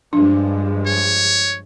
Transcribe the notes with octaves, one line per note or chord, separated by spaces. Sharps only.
G2 F3 G#3 D4
C#5